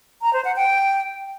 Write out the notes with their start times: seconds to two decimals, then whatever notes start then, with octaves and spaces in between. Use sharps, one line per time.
0.22 A#5
0.33 C5
0.45 F#5
0.56 G5